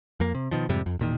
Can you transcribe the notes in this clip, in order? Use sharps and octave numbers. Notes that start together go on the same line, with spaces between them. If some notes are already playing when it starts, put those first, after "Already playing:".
F2 A#3
C3
B2 D#3 F3
F2 G#2 C3 G3
F2
E1 A#2 D#3